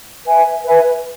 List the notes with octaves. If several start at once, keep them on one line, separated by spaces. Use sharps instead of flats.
B4 E5 G#5
B4 E5 G#5